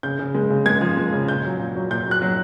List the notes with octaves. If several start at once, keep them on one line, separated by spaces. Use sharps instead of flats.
C#3 G6
C#3
G#3
C#3
G#3 G#6
F3
G#3
C#3
A#2 G6
F#3
A#2
F#3
A#2 G6
F#3 F#6
F#3